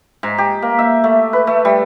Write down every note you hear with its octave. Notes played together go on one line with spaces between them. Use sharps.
G#2
G4
A#3
E5
A3
B4
A3
G3